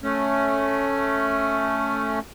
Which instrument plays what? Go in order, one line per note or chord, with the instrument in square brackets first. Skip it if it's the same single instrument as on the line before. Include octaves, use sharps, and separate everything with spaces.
[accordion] A3 C#4